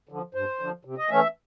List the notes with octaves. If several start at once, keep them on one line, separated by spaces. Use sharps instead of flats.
D3 F3
G2 C5
D3 F3
C3
D#5
E3 A3 C#4 E5